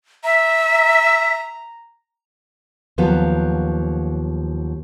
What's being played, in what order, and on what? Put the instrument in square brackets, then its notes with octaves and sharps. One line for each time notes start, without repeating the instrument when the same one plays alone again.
[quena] E5 [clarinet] A#5
[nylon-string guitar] D#2 F3 F#3 B3 A4